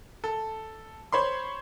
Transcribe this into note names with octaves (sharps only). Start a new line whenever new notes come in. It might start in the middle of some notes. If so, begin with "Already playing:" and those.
A4
C5 C#5 B5 C6